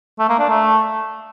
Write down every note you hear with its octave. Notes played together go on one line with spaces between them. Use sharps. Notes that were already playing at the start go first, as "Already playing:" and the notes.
A3
A#3
D4
A3